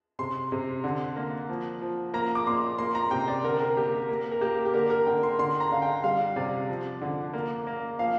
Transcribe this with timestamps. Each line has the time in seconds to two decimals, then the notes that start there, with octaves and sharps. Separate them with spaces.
0.19 C3 C6
0.52 C3
0.84 D3
1.16 A#3
1.49 F3
1.81 F3
2.14 A#3 A#5
2.35 D6
2.46 A#2 C6
2.78 A#3 C6
2.95 A#5
3.11 C3 G5
3.28 D5
3.44 D3 A#4
3.60 A#4
3.77 A#3 G4
4.09 A#3
4.31 A#4
4.41 A#3 G4
4.65 G4
4.74 D3 A#4
4.90 A#4
5.06 D3 G5
5.23 C6
5.39 D3 C6
5.60 A#5
5.71 D3 F5
5.82 G5
6.04 G3 F5
6.36 C3 D5
6.69 F3
7.01 D3
7.33 A#3
7.67 A#3
7.99 F3 F5